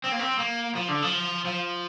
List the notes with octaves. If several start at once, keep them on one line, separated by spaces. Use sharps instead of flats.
C4
A#3
C4
A#3
F3
D3
F3
F3